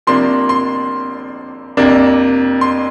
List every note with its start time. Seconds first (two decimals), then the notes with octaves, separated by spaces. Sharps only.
0.07 C3 F3 A#3 D4 C6
0.49 C6
1.77 F2 C3 A#3 D4
2.61 C6